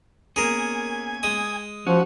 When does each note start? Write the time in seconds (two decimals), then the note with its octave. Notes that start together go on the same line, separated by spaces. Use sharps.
0.36 A#3 B3 C#4 G#4 A#4 G#5
1.23 G#3 D#6
1.87 F3 C#4 F#4